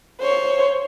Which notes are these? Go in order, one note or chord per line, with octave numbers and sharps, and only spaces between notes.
C5 C#5